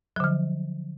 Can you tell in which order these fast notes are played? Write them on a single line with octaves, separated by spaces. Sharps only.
F#3 D3 F3